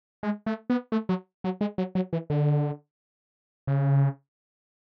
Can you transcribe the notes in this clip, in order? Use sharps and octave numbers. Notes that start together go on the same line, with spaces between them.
G#3
A3
B3
A3
F#3
F#3
G#3
F#3
F#3
E3
D3
C#3